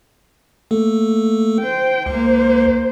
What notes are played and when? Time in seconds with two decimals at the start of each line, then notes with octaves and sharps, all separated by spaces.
0.71 A3 A#3 A4
1.61 C5 G5
2.06 C#2 A#3 C5